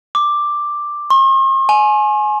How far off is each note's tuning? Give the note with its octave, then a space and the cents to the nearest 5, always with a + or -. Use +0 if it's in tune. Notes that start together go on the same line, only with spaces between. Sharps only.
D6 +5
C6 +45
G#5 +25